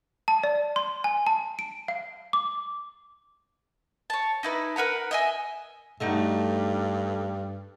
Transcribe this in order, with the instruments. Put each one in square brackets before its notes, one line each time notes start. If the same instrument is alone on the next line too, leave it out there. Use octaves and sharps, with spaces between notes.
[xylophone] A5
D5
C6
G#5
A5
D7
F5
D6
[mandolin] C#5 A5
D#4 E4 B4
A#4 B4 F#5 A#5
D#5 E5 G#5
[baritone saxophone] G2 [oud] A3 D#4 F#4